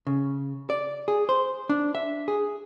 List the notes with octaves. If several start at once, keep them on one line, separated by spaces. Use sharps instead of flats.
C#3
D5
G#4
C5
D4
E5
G#4